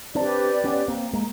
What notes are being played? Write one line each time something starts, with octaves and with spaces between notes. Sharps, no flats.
C4 D4 G4 B4 D5
B3 C#4
A#3 C4
G#3 A#3